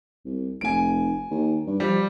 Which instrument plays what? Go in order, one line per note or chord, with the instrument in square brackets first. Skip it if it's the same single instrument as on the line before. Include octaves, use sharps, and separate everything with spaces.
[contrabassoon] C2
[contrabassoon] F1 [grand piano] G#5 D7
[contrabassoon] D#2
G2
[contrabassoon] F3 [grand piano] G3